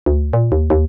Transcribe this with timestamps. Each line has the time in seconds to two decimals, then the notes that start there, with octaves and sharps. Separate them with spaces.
0.06 D2
0.33 A#2
0.52 D#2
0.70 D#2